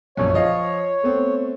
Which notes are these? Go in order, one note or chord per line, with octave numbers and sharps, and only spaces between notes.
A#1 F#2 C#5
F3 D#5 F5
A3 B3 C4